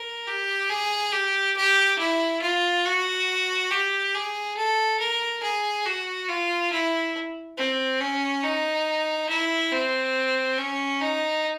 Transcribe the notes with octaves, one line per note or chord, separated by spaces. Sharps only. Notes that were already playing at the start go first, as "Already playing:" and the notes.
Already playing: A#4
G4
G#4
G4
G4
E4
F4
F#4
G4
G#4
A4
A#4
G#4
F#4
F4
E4
C4
C#4
D#4
E4
C4
C#4
D#4